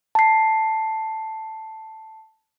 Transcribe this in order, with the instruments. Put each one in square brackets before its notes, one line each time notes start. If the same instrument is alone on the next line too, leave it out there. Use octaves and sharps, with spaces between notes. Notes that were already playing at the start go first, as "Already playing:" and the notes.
[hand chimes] A5 C7